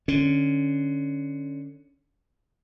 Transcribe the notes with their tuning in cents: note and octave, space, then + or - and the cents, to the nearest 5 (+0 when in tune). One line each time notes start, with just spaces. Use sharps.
D3 +15 C#4 +5